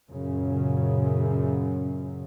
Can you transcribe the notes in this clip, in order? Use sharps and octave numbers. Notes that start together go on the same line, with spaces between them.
F#2 A#2 C#3